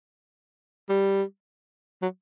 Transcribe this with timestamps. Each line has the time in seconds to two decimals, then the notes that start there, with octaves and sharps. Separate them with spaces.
0.89 G3
2.02 F#3